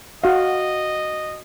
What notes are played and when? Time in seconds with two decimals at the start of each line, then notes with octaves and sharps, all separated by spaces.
0.24 F#4 D#5 F5